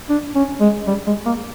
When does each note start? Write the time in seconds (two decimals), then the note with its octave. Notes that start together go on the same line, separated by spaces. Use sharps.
0.09 D4
0.35 C#4
0.60 G#3
0.87 G3
1.07 G#3
1.26 A#3